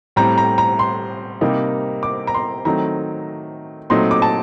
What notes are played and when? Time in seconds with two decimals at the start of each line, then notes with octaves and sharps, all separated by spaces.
0.16 A2 G3 C4 A#5
0.38 A#5
0.58 A#5
0.79 C6
1.41 C3 G3 A#3 D#4
2.03 D6
2.27 A#5
2.34 C6
2.65 D#3 F#3 A3 C4 D#4 A#5
3.90 A#2 F#3 A3 C4 D#4 C6
4.11 D6
4.22 A5